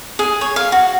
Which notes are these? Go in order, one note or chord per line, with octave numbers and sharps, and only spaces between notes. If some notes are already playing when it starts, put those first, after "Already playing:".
G#4
C#5
F5
F#4